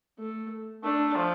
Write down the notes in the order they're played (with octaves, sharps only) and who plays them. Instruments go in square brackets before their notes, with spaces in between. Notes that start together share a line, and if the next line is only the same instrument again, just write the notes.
[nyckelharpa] A3
[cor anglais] A3 [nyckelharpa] D4
[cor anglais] F3